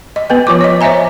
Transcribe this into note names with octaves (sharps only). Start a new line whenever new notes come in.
D#5
B3 B4 G5
F3 F4 D6
C#5 D#5
C5 C#5 D#5 E5 G#5 A#5